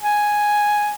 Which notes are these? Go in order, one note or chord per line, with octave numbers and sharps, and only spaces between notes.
G#5